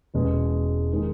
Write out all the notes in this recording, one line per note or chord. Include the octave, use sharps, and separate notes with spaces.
E1 E2 B2 G#3 C#4
D#3 G#3